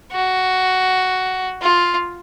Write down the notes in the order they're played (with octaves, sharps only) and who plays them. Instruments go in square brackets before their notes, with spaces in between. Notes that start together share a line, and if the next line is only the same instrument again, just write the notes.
[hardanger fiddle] F#4
F4